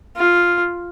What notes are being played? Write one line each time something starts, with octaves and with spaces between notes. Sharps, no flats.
F4